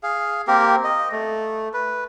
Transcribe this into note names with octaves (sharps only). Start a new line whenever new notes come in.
G#4 F5
A#3 C4 G4 A#4
D#5
A3
B4